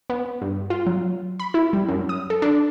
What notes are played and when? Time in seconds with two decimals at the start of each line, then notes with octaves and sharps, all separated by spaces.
0.10 B3
0.42 G2
0.70 F4
0.86 F#3
1.39 B5
1.54 E4
1.73 G3
1.89 F#2
2.09 D#6
2.30 A4
2.42 D4